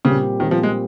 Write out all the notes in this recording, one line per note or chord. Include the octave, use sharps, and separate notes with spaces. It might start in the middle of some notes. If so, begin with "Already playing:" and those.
A#2 C#3 G3 C4 G4
A#2 D#3 G3 C4 G4
F3
G#3